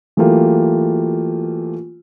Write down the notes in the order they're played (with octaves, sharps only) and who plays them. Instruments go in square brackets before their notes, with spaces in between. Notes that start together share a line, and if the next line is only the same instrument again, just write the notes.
[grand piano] E3 F#3 A3 A#3 F4 G4